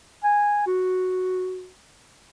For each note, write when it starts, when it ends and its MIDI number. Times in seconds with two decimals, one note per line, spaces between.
0.24 0.62 80
0.67 1.70 66